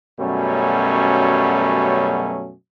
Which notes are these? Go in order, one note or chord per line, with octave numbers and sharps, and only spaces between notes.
F#2 B2 F#3 G3 A3 C#4